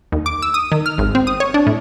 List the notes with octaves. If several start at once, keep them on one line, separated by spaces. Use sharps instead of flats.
D#2
D6
E6
D#6
D#3
F6
G#1
C4
D#6
C#5
D4
A2